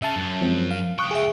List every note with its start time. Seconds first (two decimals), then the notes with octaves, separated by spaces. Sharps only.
0.02 C#3 E5 A5
0.16 F#2
0.41 F3 G#3 C4
0.71 F5
0.99 C#2 G5 C#6 D#6 F#6
1.11 G#4 E5